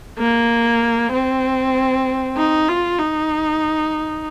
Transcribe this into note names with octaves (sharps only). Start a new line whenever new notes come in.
A#3
C4
D#4
F4
D#4